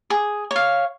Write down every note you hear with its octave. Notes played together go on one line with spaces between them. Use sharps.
G#4
C#5
F5